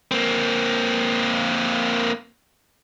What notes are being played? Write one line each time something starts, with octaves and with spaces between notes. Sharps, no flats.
A#3 C4